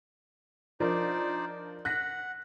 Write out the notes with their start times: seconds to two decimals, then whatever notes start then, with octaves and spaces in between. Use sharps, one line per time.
0.80 F3 D4 D#4 A#4 C5 D5
1.85 F#5 F#6 A#6 B6